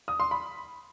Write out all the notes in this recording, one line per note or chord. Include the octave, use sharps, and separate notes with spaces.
D#6
C6
B5